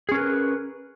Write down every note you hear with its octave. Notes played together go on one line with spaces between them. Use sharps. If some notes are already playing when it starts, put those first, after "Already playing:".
C#4 G#4 A#4 B4